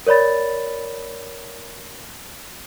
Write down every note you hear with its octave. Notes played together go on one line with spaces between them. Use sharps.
A#4 C#5 D5 B5 A6